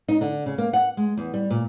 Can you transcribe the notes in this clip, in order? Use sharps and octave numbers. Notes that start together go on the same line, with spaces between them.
D#4
D3
C#3
A#3
F#5
G#3
E2
G3
A#2